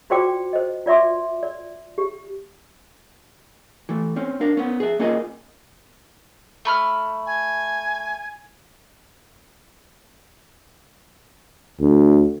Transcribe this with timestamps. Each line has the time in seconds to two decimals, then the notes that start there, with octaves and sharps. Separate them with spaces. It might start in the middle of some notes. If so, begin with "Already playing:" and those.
0.10 F4 F#4 C5 D5 G5 D6
0.53 C5 D#5
0.86 F4 D5 E5 C6 D6
1.43 D5
1.98 G4
3.89 E3 A3
4.16 C4 C#4
4.41 D4 A#4 F5
4.57 B3 C#4
4.80 G#4 E5
4.99 A#3 C#4 F4 G#4 A#4 D#5
6.65 A3 B5 F6
7.26 G#5
11.80 D2